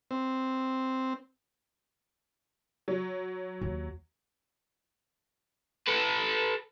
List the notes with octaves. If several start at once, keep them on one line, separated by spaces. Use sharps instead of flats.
C4
F#3
D#2
A4 B4